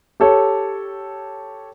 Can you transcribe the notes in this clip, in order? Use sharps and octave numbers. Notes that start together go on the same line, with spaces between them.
G4 A4 C#5